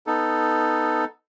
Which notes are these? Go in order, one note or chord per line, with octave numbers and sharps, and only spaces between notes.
B3 D#4 A4